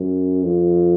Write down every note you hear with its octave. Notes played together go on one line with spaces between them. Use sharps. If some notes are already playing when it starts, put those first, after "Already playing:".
Already playing: F#2
F2